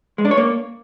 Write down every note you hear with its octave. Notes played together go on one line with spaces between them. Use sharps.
G#3
D4
C#5
A#3